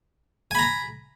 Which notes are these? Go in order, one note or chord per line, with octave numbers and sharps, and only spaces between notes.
G#5 A#5 B5